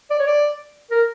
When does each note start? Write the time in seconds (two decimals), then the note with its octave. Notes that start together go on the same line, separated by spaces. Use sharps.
0.11 D5
0.19 C#5
0.27 D5
0.91 A#4